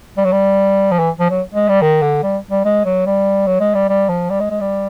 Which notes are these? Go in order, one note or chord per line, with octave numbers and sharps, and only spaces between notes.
G3
F#3
G3
F3
E3
F3
F#3
G#3
G3
D#3
D3
G3
G3
G#3
F#3
G3
F#3
G#3
G3
G3
F3
G3
G#3
G#3
G3